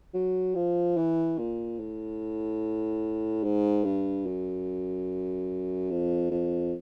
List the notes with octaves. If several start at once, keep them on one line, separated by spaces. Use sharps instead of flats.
F#3
F3
E3
A#2
A2
G#2
G2
F#2
F2
F2